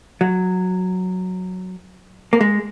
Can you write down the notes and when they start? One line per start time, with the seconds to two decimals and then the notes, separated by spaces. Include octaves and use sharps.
0.21 F#3
2.33 A#3
2.41 G#3